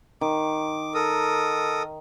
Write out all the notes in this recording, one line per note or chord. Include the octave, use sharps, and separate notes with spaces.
D#3 D6
A4 A#4 D#6